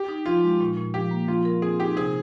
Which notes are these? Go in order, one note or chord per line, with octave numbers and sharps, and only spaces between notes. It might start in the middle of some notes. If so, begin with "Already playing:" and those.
Already playing: G4
D#4
F3 F4
G#3
A#2
A#2
F3 G4
A#3
F3 F4
A#4
C4 G#4
D#4 G4
C3 G#4